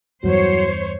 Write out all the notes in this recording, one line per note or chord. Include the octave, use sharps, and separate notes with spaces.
E2 G2 E3 F#3 C5 C#5